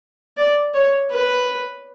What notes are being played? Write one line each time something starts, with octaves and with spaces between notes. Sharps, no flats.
D5
C#5
B4